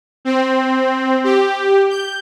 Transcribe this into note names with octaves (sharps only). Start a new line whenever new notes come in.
C4
G4
G6